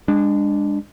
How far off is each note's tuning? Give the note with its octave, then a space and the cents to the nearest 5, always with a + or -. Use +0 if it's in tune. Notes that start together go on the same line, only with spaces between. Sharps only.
G#3 -30 D4 +0